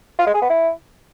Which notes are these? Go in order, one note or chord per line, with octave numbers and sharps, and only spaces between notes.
F4
G#3
G#4
B3
E4